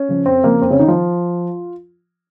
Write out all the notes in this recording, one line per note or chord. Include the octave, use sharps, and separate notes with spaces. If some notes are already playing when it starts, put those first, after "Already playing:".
Already playing: C#4
C#3 F3
F2 C4
C#3 F3 A#3
F2 C4
C#3 C#4
D#3 D#4
F3 F4